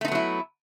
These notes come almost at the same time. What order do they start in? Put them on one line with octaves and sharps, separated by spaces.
A3 D#4 B3 F#3 E4